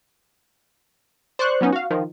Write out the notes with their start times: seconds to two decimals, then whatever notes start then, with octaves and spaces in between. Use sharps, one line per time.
1.39 C5 D5 C6 C#6 F#6
1.61 F#3 B3 C#4 D#4
1.72 F#4 F5
1.90 D#3 F3